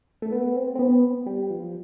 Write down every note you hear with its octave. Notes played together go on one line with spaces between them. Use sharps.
A3
B3
C4
C4
B3
G3
F3